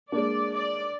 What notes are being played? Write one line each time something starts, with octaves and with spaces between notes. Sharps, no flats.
G#3 A#3 D4 D5
D5